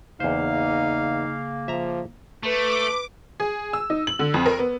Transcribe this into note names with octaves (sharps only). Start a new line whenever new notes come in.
E2 C#3 A#3 D#4 C5 F5
F3 E5 A#5
A3 B4 D6
G#4
E6
D#4
F#7
D3
F2
A#4
B3